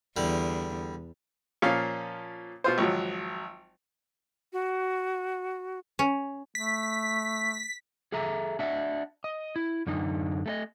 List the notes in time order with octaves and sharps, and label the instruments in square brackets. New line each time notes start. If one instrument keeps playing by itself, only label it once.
[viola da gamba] E2 [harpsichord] D3 G3
[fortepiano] A#2 F3 C#4 F5
B2 F4 C5
G#1 F3 F#3
[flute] F#4
[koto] C#4
[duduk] A3 [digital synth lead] B6
[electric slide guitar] G#4 A4 E5 A#5
D4 D#5 E5 F#5
D#5
E4
F#2 D3 D#4
A3 A4 D#5